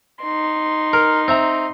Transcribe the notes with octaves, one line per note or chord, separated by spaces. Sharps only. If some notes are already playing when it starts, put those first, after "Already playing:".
D#4 C6
A#4
C4 E5 A#5